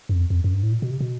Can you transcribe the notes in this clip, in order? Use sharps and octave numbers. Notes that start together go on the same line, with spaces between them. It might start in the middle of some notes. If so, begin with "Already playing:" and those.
F#2
F2
F2
F#2
G2
A2
A#2
B2
C3
B2